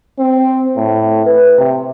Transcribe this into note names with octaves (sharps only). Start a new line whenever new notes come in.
C4
A2
B4
C3